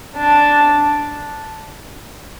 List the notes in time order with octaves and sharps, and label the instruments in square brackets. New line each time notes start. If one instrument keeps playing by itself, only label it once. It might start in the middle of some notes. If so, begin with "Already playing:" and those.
[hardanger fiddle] D4